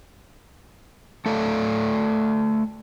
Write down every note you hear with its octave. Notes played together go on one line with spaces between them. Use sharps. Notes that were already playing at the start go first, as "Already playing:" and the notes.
A3 A4 D5 F5